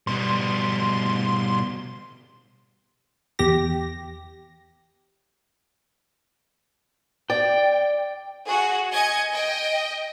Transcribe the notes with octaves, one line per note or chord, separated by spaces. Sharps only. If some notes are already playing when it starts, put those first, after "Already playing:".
B2 G3 C6
E2 G4 A#6
D5 G5
F#4 G#4
D#5 G#5 G#6 C#7
D#5 G5